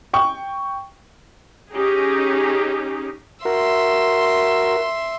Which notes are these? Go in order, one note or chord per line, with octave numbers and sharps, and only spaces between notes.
G5 C#6
C#4 D#4 G4 G#4
F#4 A#4 E5 C6